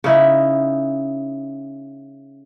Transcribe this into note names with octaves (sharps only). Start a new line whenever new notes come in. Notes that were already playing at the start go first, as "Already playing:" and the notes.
C#3 D#4 E4